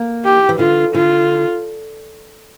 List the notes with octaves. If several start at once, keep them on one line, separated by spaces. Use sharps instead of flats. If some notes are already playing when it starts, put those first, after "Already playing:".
Already playing: A#3
G4
E3
D3 F4
D3 F4